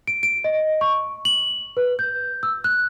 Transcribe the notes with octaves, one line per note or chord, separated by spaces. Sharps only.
D7
D7
D#5
C#6
F#7
B4
G6
E6
F#6